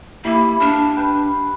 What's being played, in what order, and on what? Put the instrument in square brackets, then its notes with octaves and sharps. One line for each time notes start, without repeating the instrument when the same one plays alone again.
[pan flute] A#3 [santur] E4 G4 B5
[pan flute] D4 [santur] F5
[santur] B4 G5